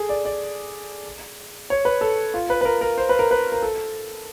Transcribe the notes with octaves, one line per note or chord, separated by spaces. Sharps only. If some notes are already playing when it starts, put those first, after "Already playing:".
Already playing: G#4 A4
D5
D5
C#5
B4
A4
F4
B4
B4
A#4
A#4
C5
B4
A#4
B4
A#4
A4